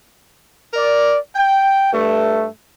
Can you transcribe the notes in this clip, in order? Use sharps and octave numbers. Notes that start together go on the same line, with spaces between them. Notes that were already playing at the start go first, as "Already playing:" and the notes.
A#4 D5
G5
G2 A3